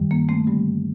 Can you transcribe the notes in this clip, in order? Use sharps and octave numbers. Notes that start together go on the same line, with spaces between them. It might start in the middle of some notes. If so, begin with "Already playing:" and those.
Already playing: G2 D#3 G3
A#3
A3 C4
G2 D3 G3